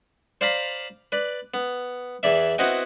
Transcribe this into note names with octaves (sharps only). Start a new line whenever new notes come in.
C5 D5 F5 A#5 B5
B4 D5
B3
E2 E3 D5 E5
B3 C4 E4 F#4 D#5 G5